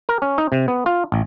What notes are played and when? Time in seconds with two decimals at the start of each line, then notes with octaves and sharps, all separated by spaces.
0.09 A#4
0.22 C#4
0.38 D#4
0.52 C3
0.68 B3
0.86 F4
1.12 A1